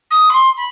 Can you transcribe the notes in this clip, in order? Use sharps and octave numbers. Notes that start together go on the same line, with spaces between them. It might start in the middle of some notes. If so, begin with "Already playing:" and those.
D#6
B5
C6
B5